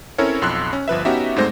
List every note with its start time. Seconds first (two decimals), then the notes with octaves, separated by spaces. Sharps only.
0.18 C4 C#4 E4 A4 A#4 C#5
0.42 B1 F2 C6 E6 F#6
0.73 C#4
0.88 G1 F3 B4 E5
1.05 B3 C#4 D#4 F#4 G4 E5
1.37 G#2 G3 A3 C4 C5 A#6